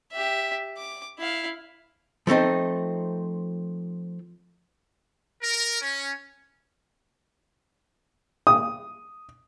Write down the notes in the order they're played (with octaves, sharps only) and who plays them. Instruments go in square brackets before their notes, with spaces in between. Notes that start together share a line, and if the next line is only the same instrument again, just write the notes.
[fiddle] G4 E5
D6
E4 F5
[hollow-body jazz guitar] F3 A3 C4 D#4
[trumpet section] A#4
C#4
[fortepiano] D#6